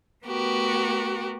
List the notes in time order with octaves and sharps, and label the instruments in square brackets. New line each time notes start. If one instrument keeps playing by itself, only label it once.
[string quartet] A3 B3 F#4 G4 A#4